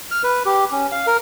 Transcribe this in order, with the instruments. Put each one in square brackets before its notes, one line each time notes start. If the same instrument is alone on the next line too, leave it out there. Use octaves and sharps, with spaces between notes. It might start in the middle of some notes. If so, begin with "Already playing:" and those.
[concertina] F6
B4
G4
C#4
F5
A#4